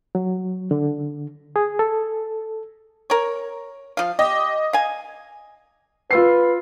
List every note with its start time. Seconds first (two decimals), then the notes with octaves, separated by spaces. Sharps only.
0.15 F#3
0.71 D3
1.56 G#4
1.79 A4
3.10 A#4 C#5
3.97 F3 F5
4.19 G4 D#5
4.73 F5 G#5
6.11 F4 B4 E6 C7